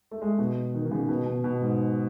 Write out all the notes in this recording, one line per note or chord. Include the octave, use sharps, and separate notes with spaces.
A3
G#3
B2
D#3
D#3
C#3
B2
B2
B2
G#2